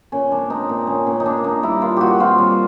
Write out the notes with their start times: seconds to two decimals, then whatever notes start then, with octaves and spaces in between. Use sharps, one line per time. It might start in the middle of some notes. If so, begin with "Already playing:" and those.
0.12 A#2 C#4
0.31 C4 D4
0.50 C4 D#4
0.69 A#2
0.87 A#2 C#4
1.07 A#2 C#4
1.20 D#4
1.26 A#2 D4
1.44 A#2 D#4
1.63 G3 E4
1.82 A#2 F4
1.96 A#2 F#4 G4
2.20 C4 F4
2.38 G3